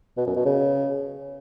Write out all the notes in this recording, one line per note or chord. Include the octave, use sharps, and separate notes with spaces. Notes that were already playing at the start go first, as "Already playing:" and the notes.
B2
F#2
B2
C#3